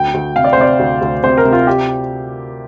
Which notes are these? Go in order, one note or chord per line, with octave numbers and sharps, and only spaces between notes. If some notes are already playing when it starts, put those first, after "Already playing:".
Already playing: D2 G5
D2
C3 F5
D5
C5
C3 D5
D2
D2
C3 C5
A#4
C3
F4
G4